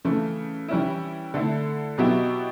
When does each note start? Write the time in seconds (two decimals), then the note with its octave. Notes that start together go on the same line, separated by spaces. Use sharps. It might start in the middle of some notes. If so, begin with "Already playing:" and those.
0.05 C#3 E3 A3
0.68 E3 G3 C#4 E4
1.34 D3 A3 E4
1.98 B2 F#3 B3 E4 G4